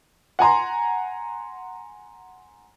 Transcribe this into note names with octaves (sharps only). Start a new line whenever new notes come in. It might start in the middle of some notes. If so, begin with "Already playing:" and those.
F#5 G#5 A#5 C6